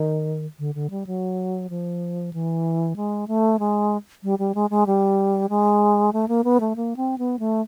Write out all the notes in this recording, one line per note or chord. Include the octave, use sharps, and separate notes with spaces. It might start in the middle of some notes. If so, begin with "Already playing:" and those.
Already playing: D#3
D3
D3
G3
F#3
F3
E3
G#3
A3
G#3
G3
G3
G#3
G#3
G3
G#3
A3
A#3
B3
A3
A#3
C4
B3
A3